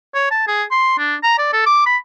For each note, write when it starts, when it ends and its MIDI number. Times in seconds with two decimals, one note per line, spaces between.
0.14 0.26 73
0.31 0.45 81
0.48 0.63 68
0.71 0.96 84
0.98 1.16 62
1.23 1.37 82
1.39 1.50 74
1.53 1.65 69
1.66 1.82 86
1.86 1.97 83